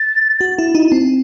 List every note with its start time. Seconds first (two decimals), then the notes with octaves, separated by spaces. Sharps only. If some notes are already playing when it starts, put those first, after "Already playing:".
Already playing: A6
0.41 F#4
0.58 E4
0.75 D#4
0.92 C4